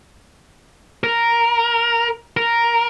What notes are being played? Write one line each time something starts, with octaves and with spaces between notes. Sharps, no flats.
A#4
A#4